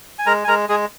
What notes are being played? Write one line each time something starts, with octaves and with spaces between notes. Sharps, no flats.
G#5
G#3 A#4 A#5
G#5
G#3 A#4 A#5
G#3 G#4 G#5